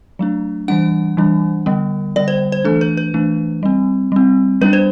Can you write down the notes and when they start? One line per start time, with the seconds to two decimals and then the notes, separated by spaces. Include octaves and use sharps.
0.19 F#3 A3 D4
0.68 E3 G3 D4 F#5
1.17 E3 G3 D4
1.66 D3 G3 B3
2.16 D3 G3 B3 D5
2.28 C5
2.52 C5
2.64 E3 A3 D4 A4
2.81 B4
2.97 B4
3.14 E3 A3 D4
3.63 G3 C4
4.12 G3 C4
4.61 G3 B3 D4 B4
4.73 C5